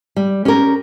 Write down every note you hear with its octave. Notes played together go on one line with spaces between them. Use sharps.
G3
C#4 G4 A#4